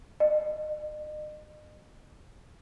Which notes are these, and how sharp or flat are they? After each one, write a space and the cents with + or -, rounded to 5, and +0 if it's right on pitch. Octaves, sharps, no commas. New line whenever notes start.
D#5 -40